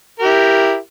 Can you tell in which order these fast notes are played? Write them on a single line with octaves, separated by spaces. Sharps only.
A#4 G4 E4